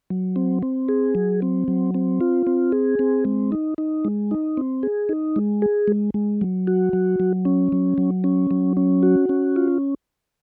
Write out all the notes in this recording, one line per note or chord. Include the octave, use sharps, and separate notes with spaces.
F#3
C4
C4
G#4
F#3
C4
F#3
C4
F4
C4
G#4
C4
G#3
D#4
D#4
G#3
D#4
C4
G#4
D#4
G#3
G#4
G#3
G#3
F#3
F#4
F#3
F#3
C#4
F#3
F#3
C#4
F#3
C#4
F#4
C#4
F4